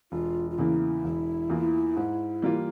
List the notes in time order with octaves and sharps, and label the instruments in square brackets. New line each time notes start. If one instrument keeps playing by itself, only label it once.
[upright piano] E1 [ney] F4
[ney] F4
[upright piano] E2 C#3 E3 A#3 [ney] E4
[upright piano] E1
E2 E3 A#3 F4
G#2
E3 G3 A#3 F4